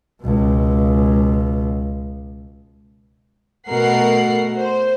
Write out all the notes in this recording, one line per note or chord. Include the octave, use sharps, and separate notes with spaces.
C#2 B2
B2 A3 F#4 A#4 F#5 C7
C5